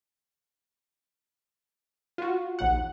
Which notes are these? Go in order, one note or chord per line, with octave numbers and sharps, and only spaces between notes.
F4 F#4
A#1 D#2 F#5